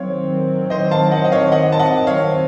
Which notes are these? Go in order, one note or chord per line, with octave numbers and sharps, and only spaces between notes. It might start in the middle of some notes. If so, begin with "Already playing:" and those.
Already playing: D#3 F#3 C4 C#5 F5
C5 D#5
F5 A5
D#5 F#5
D#5
C#5 F5
D#5 F#5
A5
D#5 F#5
C#5 F5